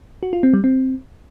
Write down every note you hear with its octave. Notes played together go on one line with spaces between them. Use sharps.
F#4
F4
C4
G3
C4